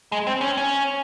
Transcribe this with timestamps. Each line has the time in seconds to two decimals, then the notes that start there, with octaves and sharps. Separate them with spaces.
0.12 G#3
0.27 C4
0.41 C#4
0.57 C#4